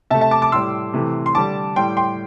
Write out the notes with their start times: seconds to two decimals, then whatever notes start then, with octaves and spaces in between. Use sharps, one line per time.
0.10 C3 E5 A5
0.14 A3
0.21 E5 A5
0.31 A5 D6
0.42 A5 D6
0.52 A2 G3 C6 E6
0.94 C3 E3 A3
1.26 C6
1.35 D3 G3 A5 D6
1.76 A2 G3 G5 C6
1.97 G5 C6